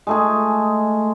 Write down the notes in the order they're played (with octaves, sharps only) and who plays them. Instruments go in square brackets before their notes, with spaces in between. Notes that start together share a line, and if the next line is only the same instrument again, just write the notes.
[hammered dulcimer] G#3 A3 G#4